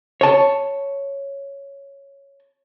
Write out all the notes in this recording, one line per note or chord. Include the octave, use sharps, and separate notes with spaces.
C#5 A5